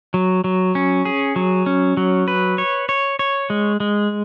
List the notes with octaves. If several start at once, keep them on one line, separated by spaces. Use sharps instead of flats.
F#3
F#3
C#4
G#4
F#3
C#4
F#3
B4
C#5
C#5
C#5
G#3
G#3